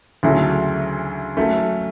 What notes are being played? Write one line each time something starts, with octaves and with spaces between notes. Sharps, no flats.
D2 C#3 F#3 A3 E4
F#3 A3 C#4